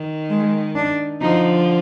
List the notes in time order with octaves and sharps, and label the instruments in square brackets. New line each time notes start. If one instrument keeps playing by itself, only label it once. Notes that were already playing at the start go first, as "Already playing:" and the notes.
Already playing: [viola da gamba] D#3
[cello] G#3
D4
[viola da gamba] D3 F3 [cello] D#4